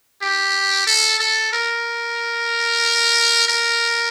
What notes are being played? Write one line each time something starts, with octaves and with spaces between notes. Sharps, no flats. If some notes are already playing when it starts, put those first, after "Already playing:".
G4
A4
A4
A#4
A#4